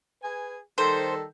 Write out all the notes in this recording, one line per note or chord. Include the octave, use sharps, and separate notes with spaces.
G#4 B4 G#5
D#3 G3 A4 C5